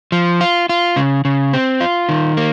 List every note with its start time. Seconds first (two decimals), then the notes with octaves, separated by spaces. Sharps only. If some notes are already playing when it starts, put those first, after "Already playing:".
0.12 F3
0.41 F4
0.69 F4
0.96 C#3
1.25 C#3
1.54 C4
1.81 F4
2.09 D#3
2.37 A#3